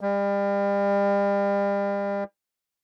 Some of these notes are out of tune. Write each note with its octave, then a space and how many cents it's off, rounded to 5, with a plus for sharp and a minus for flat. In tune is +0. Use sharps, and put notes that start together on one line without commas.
G3 +35